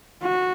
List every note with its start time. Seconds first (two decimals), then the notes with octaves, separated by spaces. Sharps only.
0.23 F#4